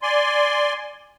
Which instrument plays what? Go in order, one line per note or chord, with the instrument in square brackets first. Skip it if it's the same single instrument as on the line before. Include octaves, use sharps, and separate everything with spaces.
[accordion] D5 G#5 C6